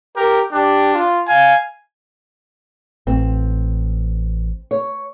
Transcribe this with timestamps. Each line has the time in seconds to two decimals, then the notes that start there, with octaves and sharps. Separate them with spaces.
0.16 G4 A#4
0.52 D4 G4
0.93 F4
1.28 F5 G#5
3.07 A1 C4
4.71 C#5